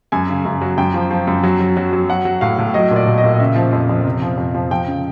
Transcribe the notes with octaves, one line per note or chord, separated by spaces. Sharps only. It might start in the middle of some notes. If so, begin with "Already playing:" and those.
F#2 G#5
C#3
F#2
F#3
F#2 G5
F3
F3
F#2
F#3
F#3
F#3
F#3
F#3 F#5
F#3
A2 F5
A2
F#3 D#5
A#2 D5
A#2
D#5
A#2
D#5
C#3 E5
F3
F2
F2
C3
F3
F2
F3
F3 G5
C#3